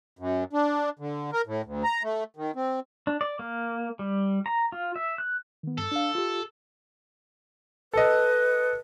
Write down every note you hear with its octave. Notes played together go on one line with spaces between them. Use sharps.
F#2
D4
D3
A#4
A2
D2
A#5
A3
D#3
C4
D4
D5
A#3
G3
A#5
F4
E5
F#6
D#3 B3
G2 A4
D4 F5
F4 G4
A4 B4 D#5